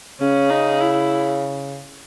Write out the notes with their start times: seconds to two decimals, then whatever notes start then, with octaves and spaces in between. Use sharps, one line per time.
0.20 C#3 C#4
0.50 D#4
0.81 E4